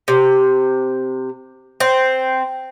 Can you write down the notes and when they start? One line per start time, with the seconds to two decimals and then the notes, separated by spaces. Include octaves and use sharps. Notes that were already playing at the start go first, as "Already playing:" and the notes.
0.08 C3
1.80 C4